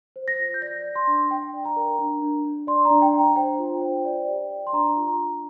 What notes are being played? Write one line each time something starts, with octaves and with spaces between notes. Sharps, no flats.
C5
A#6
F4
G6
D5 A#6
D5
C6
D4
D4 G5
D5
A#5
A#4
D4
D4
D4
D5 C6
A#5
D4
G5
D4
A#5
C5 G5
F4
C5
D5
G4
D5
C6
D4 A#5
F4
A#5
D4